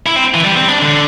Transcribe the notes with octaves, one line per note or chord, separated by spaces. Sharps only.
E4
C4
E3
G3
C4
D4
D3